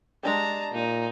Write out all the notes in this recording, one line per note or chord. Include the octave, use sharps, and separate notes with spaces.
G#3 D4 G4 A5 A#5
A#2 D#4